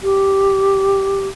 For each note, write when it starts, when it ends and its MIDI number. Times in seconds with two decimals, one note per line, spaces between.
0.03 1.28 67